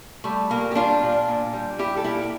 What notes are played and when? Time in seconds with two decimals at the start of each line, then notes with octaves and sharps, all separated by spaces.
0.24 G3 A3
0.50 A#2 A#3
0.72 G4
0.75 G3 D4 F4
1.02 A#2
1.28 A#2
1.53 G3
1.79 G3 E4 G4
1.97 A4
2.04 A#2 E4 G4